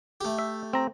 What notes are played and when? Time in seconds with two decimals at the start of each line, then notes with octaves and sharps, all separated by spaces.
0.21 A3 G4
0.39 E5
0.73 C4 A#5